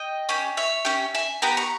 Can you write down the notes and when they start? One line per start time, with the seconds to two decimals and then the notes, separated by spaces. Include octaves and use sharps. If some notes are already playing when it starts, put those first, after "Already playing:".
Already playing: D#5 G5
0.29 C#4 G4
0.57 C#5 E5
0.85 C#4 G4
1.14 E5 G#5
1.42 B3 G4 G5 A#5
1.57 A#5 C#6